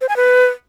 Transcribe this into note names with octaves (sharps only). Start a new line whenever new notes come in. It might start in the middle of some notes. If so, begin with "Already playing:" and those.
C5
G#5
B4